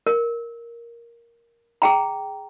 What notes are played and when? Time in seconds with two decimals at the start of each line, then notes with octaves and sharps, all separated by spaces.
0.07 A#4
1.82 G#4 G5 A#5